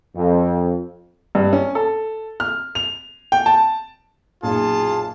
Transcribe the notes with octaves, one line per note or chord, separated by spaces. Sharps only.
F2
G2
C#4
A4
F6
F7
G5
A5
B1 F#2 A#2 F4 G#4 A5